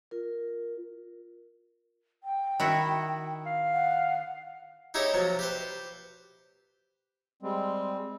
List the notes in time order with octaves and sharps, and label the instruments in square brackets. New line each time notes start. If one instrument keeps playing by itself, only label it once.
[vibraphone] F4 A#4
[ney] G5
[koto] D#3 E4 F#4
[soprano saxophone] F5
[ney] F#5
[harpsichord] D#4 E4 G4 G#4 C#5 D#5
C3 F3 F#3
G4 B4 C5
[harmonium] G3 G#3 C4